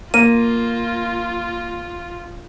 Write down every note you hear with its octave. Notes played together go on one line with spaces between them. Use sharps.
A#3 F4 D#7